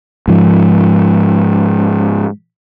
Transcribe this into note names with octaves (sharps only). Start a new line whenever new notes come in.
G#2 F3